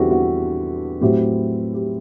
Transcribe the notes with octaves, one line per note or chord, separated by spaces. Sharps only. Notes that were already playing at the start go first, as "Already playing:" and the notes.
Already playing: E2 D3 G3 C4 E4 F#4 G4 A4
F#4
A2 F#3 C4 E4 G4
G4